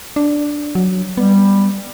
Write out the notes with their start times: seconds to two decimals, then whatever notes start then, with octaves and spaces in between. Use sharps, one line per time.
0.16 D4
0.75 F#3
1.17 G3 B3